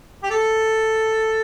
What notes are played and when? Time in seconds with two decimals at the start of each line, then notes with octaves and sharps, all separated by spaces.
0.23 G4
0.30 A4